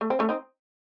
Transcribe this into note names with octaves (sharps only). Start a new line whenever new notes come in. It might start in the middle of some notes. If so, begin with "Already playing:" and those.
A3
C4
A3 C#4
C4 D#4